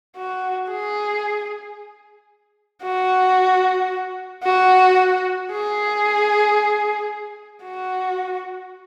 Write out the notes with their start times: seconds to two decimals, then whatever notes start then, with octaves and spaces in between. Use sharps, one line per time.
0.17 F#4
0.70 G#4
2.83 F#4
4.44 F#4
5.52 G#4
7.64 F#4